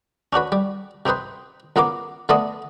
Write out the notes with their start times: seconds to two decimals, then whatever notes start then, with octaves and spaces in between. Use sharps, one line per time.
0.33 C#4 D4 F#4 B4
0.52 G3
1.06 C3 C4 D#4 B4 C5
1.76 C#2 B3 A#4 F5 D6
2.29 D3 A3 B3 D4 D#5